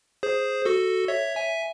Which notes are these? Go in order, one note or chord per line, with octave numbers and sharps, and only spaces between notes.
G#4 C5
F#4 A4
C#5 E5
E5 G#5